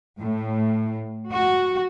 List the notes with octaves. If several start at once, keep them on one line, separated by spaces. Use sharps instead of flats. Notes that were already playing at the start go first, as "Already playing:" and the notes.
A2
F#4